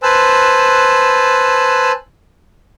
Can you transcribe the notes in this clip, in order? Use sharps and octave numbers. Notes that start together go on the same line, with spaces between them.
B4 C5 G#5 A5 E6 F#6